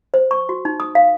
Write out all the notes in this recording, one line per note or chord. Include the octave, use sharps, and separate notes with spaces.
C5
C#6
F#4
D#4
D#6
F5